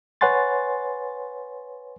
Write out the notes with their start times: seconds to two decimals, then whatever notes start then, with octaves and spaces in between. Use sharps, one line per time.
0.21 B4 C#5 F#5 G#5 C6 A6